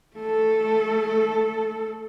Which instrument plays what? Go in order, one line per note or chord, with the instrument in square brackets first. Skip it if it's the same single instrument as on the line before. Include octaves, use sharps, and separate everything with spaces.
[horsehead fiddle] A3 A4